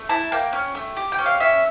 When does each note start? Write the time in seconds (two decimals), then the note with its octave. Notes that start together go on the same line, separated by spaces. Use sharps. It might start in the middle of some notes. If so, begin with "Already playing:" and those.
Already playing: A3
0.09 E4 A5
0.32 A#3 G5
0.53 C#4
0.75 A3
0.97 G4
1.12 G5
1.19 C#4
1.26 F5
1.40 C#4 E5